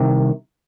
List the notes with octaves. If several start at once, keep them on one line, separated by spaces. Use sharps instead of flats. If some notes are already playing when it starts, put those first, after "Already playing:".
Already playing: C2 C3 D#3